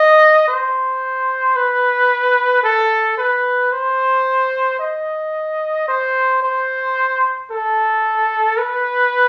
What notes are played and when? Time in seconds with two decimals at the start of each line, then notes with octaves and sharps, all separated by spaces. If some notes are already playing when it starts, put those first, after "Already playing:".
Already playing: D#5
0.48 C5
1.56 B4
2.63 A4
3.18 B4
3.72 C5
4.80 D#5
5.88 C5
6.43 C5
7.51 A4
8.58 B4